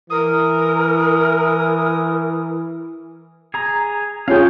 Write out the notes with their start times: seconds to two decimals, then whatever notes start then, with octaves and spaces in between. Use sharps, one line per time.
0.10 E3 A#4 D#6
3.54 G#4 A#5
4.28 C#4 F4 G#4 F5 G5